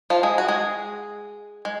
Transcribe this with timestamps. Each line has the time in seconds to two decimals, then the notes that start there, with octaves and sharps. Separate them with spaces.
0.10 F3 F4
0.23 G#3 G#4
0.38 F#4
0.48 G#3 G#4
1.65 G#3